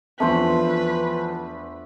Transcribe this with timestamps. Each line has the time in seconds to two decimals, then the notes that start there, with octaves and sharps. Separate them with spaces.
0.20 E2 F3 A3 D4 B4 C5